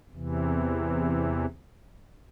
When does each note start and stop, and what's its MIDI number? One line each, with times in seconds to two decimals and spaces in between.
0.13 1.45 40
0.13 1.45 48
0.13 1.45 52